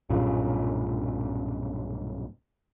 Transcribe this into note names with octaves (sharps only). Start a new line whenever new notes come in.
B1 G2 A#2 C#3